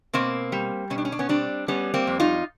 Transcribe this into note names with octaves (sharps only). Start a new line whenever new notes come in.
B2 A#3 C4
G3
B2 C#4
D4
C#4
D4
B3 C#4
G3 C4 D4
G3 B3 C#4
A#3 C4
F2
D#4 F4